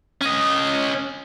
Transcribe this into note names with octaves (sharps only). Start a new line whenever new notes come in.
C#4 D#5